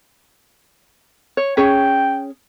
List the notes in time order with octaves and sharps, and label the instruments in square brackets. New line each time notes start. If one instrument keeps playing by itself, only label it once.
[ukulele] C#5
[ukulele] C#4 G#4 C#5 [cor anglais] G5